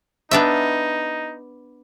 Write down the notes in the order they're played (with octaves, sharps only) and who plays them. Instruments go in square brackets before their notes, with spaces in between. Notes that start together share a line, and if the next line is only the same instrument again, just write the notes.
[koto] B3 D4 E5 [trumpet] D#4